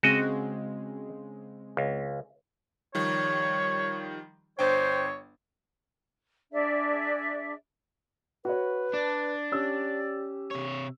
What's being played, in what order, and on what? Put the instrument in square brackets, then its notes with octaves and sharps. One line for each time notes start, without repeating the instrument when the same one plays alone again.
[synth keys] C#3 G#3 C4 [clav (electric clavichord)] F#4 D#5
[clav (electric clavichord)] C#2
[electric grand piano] D#3 F3 G3 [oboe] C#5
[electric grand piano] G1 D4 G5 [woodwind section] C5 [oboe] C#5
[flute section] D4 G#4 D5 E5
[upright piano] F#4 C#5 [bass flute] B4
[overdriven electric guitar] D4 [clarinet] D5 [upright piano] A5
[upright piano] C#4 E6 [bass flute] G4
[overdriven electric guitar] C3 C#5